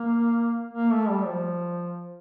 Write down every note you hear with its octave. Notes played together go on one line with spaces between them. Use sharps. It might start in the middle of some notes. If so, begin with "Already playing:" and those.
Already playing: A#3
A#3
A3
G3
F3